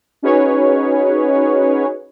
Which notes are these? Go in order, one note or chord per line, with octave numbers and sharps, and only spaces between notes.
C#4 D#4 F#4 G#4 B4 C#5